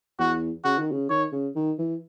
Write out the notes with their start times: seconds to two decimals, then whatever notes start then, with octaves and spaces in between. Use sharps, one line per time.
0.19 E2 F#4
0.64 C#3 F#4
0.79 D#3
0.92 C#3
1.10 D#3 C#5
1.32 C#3
1.56 D#3
1.79 E3